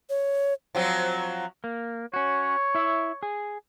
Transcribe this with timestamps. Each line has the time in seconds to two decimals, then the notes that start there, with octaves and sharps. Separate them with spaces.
0.10 C#5
0.75 F3 F#3 C4
1.64 A#3
2.14 C#4 F#4 C#5
2.75 E4 E5
3.23 G#4